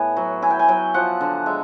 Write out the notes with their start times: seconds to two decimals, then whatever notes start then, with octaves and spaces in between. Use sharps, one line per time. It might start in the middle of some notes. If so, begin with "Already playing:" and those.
Already playing: A2 B3 G#5
0.17 F#3
0.42 E4 G#5
0.50 G5
0.59 G#5
0.68 F#3 G5
0.94 F3 F#5
1.21 D3
1.46 G#3 E5